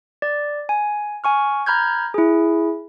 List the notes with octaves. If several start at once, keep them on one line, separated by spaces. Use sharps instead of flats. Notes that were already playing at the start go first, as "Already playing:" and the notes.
D5
G#5
G#5 C#6 F6
A#5 B5 F6 G6 G#6
E4 G#4